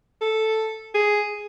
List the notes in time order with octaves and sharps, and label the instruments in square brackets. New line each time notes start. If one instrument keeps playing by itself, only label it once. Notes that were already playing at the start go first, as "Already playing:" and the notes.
[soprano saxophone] A4
G#4